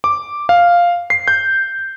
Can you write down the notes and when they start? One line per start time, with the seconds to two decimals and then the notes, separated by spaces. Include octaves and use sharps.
0.04 D6
0.49 F5
1.10 C7
1.28 G6